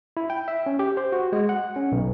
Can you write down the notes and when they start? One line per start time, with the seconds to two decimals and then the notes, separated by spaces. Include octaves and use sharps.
0.17 E4
0.30 G5
0.48 E5
0.66 C#4
0.79 G4
0.97 C5
1.12 F#4
1.33 G#3
1.49 F#5
1.76 C#4
1.92 B1